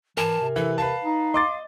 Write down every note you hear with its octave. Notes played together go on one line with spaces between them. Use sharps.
E3 A#4 G#5 A5
C3
E3 A4
B4 F5 A5
D#4
D#5 C6 D6 A6